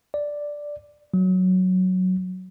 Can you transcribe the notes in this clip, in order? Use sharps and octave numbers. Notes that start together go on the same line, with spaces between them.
D5
F#3